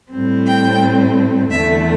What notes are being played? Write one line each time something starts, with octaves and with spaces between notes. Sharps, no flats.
A2 G3 C4
G5
E2 D3 A3 E5